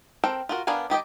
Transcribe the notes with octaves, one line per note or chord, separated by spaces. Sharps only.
C4 A4 A#4 G5
F4 F#4 A#4
B3 D4 A#4 F5 G#5
D#3 G4 D#5 G5